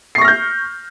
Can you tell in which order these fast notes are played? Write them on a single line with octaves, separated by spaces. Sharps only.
C7 C#6 A#6 F6 G6